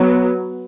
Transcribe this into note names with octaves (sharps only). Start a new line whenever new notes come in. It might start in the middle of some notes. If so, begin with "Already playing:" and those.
Already playing: F#3 B3